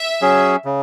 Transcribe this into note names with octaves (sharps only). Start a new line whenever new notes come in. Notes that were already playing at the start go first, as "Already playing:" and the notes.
Already playing: E5
F#3 C#4 G#4
C#3